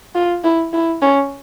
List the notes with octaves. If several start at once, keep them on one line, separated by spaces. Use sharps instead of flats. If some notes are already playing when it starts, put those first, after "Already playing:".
F4
E4
E4
C#4